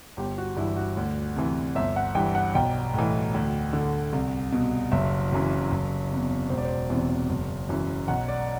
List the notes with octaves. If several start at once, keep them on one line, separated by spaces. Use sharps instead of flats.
G1 G4
F#4
G2 E3 E4
F#4
D2
C3 E3
G1 E5
F#5
G2 E3 G5
F#5
B1 G5
A2 E3
D2
D3
C2
B2
F#1 E5
F#2 E3
F#1
E2 C3
E1 C5
D5
C5
E2 C3 E3
F#1
F#2 E3
B1 F#5
D5